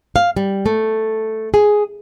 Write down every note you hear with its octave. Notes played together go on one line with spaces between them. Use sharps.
F5
G3
A3
G#4